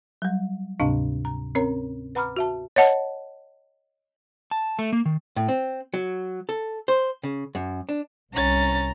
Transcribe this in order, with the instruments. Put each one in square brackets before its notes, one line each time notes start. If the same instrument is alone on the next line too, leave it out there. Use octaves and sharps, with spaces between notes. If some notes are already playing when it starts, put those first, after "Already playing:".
[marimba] F#3 G3
D2 G#2 C3 C4 D4 F5
A#5
C4 C#4 A#4 C#5 A#5
B4 F#5 A#5 B5 D6 F6
F#4 E5 A5
[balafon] C#5 D#5 F#5 A5
[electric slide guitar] A5
A3
A#3
D#3
[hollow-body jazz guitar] A2
C4
F#3
A4
C5
C#3
F#2
D4
[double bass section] C2 [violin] C#4 A6 [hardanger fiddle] A#5